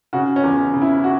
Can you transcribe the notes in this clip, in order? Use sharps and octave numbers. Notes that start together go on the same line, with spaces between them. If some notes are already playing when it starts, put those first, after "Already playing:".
C#3 F#4
C#4
E2
C#4
C#3
E4
F#4